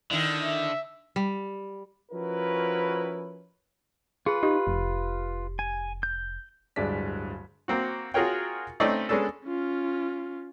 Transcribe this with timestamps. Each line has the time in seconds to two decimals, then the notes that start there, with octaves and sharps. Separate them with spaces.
0.11 D3 D#3 E4
0.43 E5
1.16 G3
2.12 F3 C#4 E4 F#4 A#4 B4
4.26 F4 G#4 B4
4.43 D#4 G4
4.67 F1
5.59 G#5
6.03 G6
6.76 D1 G2 G#3 D5 B6
7.68 A#3 C4 F#4
8.14 F4 F#4 G#4 A#4 C#5 G5
8.80 A3 C4 C#4 D#4 D5 D#5
9.09 G#3 B3 C#4 D4 A4
9.45 C#4 F4